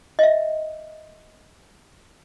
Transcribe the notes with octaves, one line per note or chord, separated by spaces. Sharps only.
D#5 E5